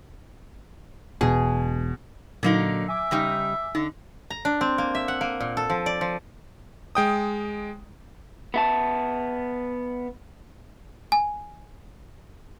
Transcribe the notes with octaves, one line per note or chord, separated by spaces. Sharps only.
E1 B2 G#4
A#2 D3 F#3 A#3 D#4
E5 G#5 D6
C#3 G3 D#4
D3 D#4
A#5
D4
C4
A#3
E5
F#5
A#3
A#2
A4
F3
D5
F3
G#3 G5 D#6
B3 E5 A5
G#5